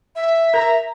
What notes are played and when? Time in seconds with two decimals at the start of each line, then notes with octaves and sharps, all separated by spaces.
0.16 E5
0.54 A#4 A#5